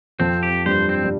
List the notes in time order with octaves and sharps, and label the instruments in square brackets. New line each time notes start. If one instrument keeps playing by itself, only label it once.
[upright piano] F2 F3 [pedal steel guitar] C4
[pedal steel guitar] G4
[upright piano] G2 G3 [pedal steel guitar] C5
[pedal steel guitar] C4
[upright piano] G3